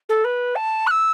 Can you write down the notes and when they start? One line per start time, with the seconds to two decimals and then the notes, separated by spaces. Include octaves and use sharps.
0.09 A4
0.24 B4
0.55 A5
0.87 F#6
0.90 E6